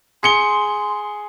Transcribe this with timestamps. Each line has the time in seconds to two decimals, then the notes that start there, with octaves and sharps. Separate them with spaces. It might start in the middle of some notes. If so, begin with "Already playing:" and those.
0.23 G#4 C6 C#7 G7